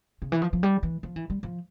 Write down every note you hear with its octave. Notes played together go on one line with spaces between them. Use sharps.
C#3
E3
F3
F3
G3
E3
F3
E3
G3
F3